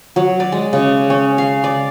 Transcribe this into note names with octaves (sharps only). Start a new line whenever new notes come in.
F#3
D5
G#3
C#3
C#4
F5
D5